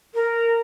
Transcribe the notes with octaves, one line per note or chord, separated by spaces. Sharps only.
A#4